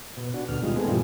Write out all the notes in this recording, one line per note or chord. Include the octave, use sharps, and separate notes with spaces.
B2
D4 F#4
D2 B2 F6
B2 G3 G#3 D#4 F4
A3 B3 C4 G#4
G2 A#2 E3 F3 G3